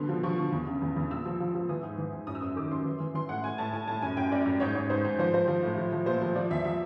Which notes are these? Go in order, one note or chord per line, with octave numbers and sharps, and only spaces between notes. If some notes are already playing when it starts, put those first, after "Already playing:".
Already playing: B2 D3 C6
F3
F3 C#6
D3
E2
C#3
E2
E2
A#2 E6
F3
F3
F3
E3 D#6
G#2
E3
G#2
F#2 D#6
E6
F#2 D#6
D#3 D6
F#2 C6
E3
E3
E3 C6
A2 F#5
A2 G#5
A2 A5
A2 G#5
A2 A5
F#2 G#5
F#2 G5
F#2 D5
F#2
G#2 C#5
G#2 C#5
G#2 C5
G#2
F3 C5
F3 C5
F3
A2
F3
F3
A#2 C5
F3
F3 D5
E2 E5
F3 E5